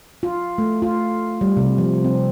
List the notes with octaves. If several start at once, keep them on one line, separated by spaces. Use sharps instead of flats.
F4
A3
F4
G3
C3
F3
C4